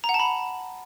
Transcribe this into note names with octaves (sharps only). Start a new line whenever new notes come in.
A#5
F#5
A5
B5